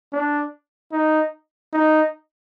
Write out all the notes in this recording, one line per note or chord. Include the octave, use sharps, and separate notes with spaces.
D4
D#4
D#4